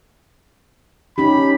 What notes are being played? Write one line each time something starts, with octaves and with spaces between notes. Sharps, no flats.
C#4 D#4 G4 B5